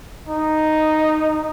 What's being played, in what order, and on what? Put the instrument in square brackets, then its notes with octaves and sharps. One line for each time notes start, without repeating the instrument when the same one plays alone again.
[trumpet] D#4